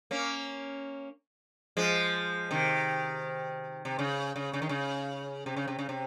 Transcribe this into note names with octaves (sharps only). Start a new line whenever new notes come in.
A#3 C#4
F3 G#3
C3 D#3
C3
C#3
C#3
C#3
D#3
C#3
C3
C#3
C3
C#3
C3